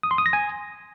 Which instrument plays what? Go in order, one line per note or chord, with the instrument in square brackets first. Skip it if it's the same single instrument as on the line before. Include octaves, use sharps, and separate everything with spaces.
[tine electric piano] D#6
C6
D#6
A#6
G#5